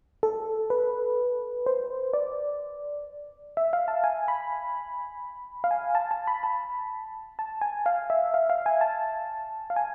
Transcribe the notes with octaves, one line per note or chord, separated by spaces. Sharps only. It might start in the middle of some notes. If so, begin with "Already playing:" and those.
A4
B4
C5
D5
E5
F5
A5
G#5
B5
F5
G#5
A5
A5
B5
A5
A5
G#5
F5
E5
F5
F5
G#5
A5
F5
G#5